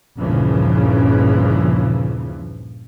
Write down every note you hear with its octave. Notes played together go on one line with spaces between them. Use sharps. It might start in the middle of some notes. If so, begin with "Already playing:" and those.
G1 D#2 A#2 C#3 E3 F3